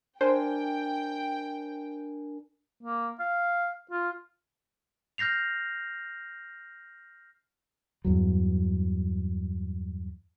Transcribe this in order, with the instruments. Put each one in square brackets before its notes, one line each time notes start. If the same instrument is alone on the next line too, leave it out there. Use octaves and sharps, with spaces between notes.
[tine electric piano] D4 A#4 G#5 [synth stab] C5 [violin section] G5
[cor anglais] A#3
F5
F4
[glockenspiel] F6 G6 A#6 C7 F7
[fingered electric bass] E2 G2 F#3